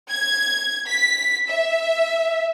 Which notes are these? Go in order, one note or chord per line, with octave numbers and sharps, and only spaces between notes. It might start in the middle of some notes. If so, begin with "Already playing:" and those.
G#6
B6
E5